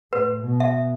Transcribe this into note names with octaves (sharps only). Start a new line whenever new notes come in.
A2 B4
B2
E5